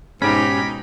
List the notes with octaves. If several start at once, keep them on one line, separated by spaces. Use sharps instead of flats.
G#2 B2 G#3 C#4 D#4 G4 B5